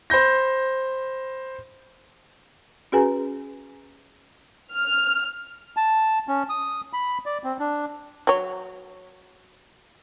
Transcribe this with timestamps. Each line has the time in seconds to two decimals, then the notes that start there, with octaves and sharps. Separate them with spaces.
0.10 C5 B5 G6 A#6
2.92 C#4 F#4 G#4 B4 G#5 A#5
4.74 F6
5.77 A5
6.28 C#4
6.49 D#6
6.93 B5
7.26 D5
7.44 C4
7.60 D4
8.27 F#3 C#5